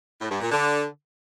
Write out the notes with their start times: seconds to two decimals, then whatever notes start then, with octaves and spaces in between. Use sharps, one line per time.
0.20 A2
0.30 G2
0.41 A#2
0.51 D3